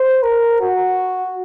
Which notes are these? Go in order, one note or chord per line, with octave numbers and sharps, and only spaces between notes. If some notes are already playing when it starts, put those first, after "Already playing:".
Already playing: C5
A#4
F#4